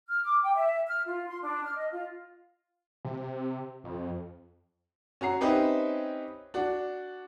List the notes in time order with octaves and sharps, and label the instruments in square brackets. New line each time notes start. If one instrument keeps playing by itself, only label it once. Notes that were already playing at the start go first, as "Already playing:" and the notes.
[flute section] F6
D6
G5
E5
F6
F4
C6
D4
F6
D#5
F4
[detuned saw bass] C3
F2
[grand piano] C#4 F#4 A#5 C7
C4 C#4 D#4 G4 B4 E5
D4 F#4